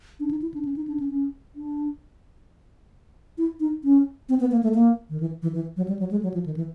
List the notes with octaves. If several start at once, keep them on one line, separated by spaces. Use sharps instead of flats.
D4
D#4
E4
D4
C#4
D#4
D4
C#4
C#4
D4
E4
D#4
C#4
C4
B3
A#3
A3
A#3
D#3
E3
E3
E3
F#3
G3
F#3
G#3
F#3
F3
D#3
E3